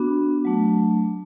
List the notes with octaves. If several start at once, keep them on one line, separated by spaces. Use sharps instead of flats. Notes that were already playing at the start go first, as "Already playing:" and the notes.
Already playing: B3 D4 F#4
F#3 A3 D4